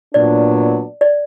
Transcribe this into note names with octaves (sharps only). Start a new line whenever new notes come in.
A#2 F#3 B3 D4 D5
D5